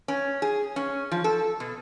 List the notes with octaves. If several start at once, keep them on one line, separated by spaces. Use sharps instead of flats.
C#4
G#4
C#4
F3
A4
B2